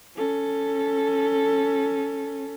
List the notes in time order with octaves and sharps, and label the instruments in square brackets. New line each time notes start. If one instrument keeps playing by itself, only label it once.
[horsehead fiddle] C#4 A4